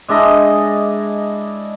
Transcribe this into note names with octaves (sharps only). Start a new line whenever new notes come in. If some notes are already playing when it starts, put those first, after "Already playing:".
G#3 D4 E4 D#5